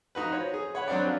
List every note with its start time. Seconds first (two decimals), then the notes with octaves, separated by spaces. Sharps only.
0.15 F3 D#4 F#4 B4
0.32 C5 C#5
0.54 G#4
0.75 C#5 F#5 B5
0.88 F#3 C4 D4 C#5 D5
1.03 F3 C#4